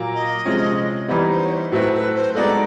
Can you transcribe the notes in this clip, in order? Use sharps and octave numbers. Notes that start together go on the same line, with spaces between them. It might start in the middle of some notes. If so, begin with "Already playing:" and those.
Already playing: A#2 F#3 A#3
D#5
C3 F3 G#3 C#4
E3 G3 B3 D#4 D5
C5
C#5
C5
A2 F#3 A3 C4 E4 B4
B4
C5
G#3 B3 D#4 F#4 A4 D5